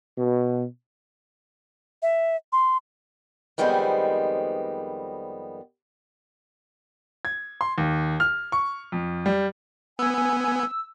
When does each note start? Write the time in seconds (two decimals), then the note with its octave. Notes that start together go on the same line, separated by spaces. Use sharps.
0.19 B2
2.02 E5
2.53 C6
3.58 F2 D#3 G3 G#3 B3 C5
7.25 G#6
7.61 C6
7.78 D#2
8.20 F6
8.52 C#6
8.92 F2
9.26 G3
9.99 B3 G#5 E6